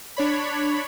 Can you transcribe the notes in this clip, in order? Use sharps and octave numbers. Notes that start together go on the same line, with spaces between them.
D4 C#5 B5